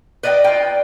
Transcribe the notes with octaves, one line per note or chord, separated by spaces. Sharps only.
B4 D5 D#5 F5 G5
F4 G5